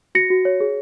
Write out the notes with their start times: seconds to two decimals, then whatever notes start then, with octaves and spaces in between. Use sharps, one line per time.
0.15 F#4 A#6 C#7
0.30 F#4
0.45 C#5
0.60 G#4